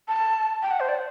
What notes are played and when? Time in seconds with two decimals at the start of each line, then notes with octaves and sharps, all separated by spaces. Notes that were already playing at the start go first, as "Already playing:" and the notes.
0.08 A5
0.62 G5
0.71 F#5
0.80 C5
0.89 D5